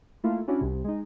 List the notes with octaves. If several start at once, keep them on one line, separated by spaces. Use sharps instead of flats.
A3 A#3 E4 F4
C#4 D4 E4 F#4
C2 C3
G#3 D#4